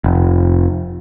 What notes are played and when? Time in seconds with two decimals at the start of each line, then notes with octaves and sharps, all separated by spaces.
0.04 F1